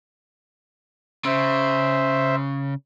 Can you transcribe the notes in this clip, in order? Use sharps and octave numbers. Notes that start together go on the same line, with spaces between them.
C#3 C5 E5